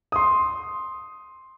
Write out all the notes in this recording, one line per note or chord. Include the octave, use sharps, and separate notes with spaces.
C6 D#6